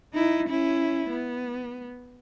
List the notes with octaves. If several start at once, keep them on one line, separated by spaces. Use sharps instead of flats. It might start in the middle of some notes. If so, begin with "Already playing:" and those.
D#4 E4
C#4 E4
B3